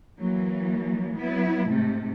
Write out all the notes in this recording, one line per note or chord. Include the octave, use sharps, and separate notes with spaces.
E3 F#3 A#3
F#3 B3 E4
G#2 C3 A3